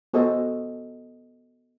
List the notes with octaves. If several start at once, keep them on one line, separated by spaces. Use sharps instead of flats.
B3 F#4 A4 C5 D#5